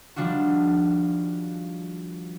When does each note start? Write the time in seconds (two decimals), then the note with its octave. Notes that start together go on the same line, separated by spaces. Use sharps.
0.16 D#3 F3 G3 D4 F4 F#4